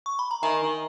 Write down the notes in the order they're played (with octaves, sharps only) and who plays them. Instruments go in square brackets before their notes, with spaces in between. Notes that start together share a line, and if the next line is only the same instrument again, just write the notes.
[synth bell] C#6
B5
A#5
[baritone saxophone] D#3 [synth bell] E5 G#5
[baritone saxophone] D#3